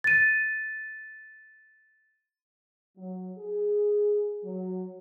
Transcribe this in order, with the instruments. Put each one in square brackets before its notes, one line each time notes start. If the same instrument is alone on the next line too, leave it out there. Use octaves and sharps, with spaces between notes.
[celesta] A6 D#7
[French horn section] F#3
G#4
F#3